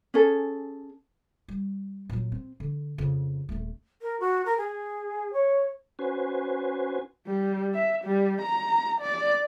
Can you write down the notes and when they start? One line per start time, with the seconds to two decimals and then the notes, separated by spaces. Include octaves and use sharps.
0.14 C#4 G#4 A4
1.48 G3
2.09 A#2 F#3
2.32 C4
2.60 D3
2.98 F2 C#3
3.49 D#1 A3
4.01 A#4
4.20 F#4
4.45 A#4
4.57 G#4
5.33 C#5
5.99 C#4 F#4 B4 C5 G#5
7.27 G3
7.74 E5
8.05 G3
8.42 A#5
9.01 D5